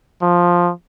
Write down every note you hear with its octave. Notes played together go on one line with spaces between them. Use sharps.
F3